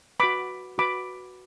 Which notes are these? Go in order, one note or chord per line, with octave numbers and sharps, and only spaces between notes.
F#4 B4 B5 D6
F#4 B4 B5 D6